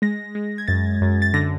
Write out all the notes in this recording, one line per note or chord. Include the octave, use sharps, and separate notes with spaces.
G#3 A#6
G#3
G#6
F#2 A6
F#2
A6
D3 A#6